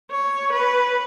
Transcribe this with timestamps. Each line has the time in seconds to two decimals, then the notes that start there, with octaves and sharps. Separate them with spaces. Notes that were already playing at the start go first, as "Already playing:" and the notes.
0.11 C#5
0.53 B4